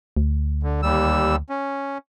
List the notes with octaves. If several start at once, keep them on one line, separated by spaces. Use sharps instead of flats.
D2
D3
D#2 G3 E6
C#4